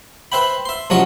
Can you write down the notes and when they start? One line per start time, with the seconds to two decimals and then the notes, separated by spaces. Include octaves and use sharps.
0.32 B4 C5 E5 G5 B5
0.65 E5 C6
0.90 C2 F3 F#3 C#4 D#5 C#6